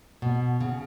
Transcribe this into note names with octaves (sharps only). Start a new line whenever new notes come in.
B2
C#3